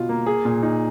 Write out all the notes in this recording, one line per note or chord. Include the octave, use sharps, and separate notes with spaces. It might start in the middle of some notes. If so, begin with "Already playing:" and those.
Already playing: B2 F4
A#3
G#4
A#2
D#4